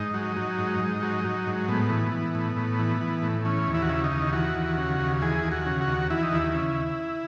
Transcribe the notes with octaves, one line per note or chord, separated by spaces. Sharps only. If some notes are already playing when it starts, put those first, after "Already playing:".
Already playing: G#2 D#4
F#3
F#3
G#2
G#2
F#3
F#3
G#2
A2 B3
E3
E3
A2
A2
E3
E3
A2
E3 C#4
D#2
E4
F#4
C#3 E4
D#4
D#2
E3 F#4
D#2
C#3
D#2
E3 G#4
D#2
F#4
C#3
F#4
D#2
E3 E4
D#4
D#2 E4
C#3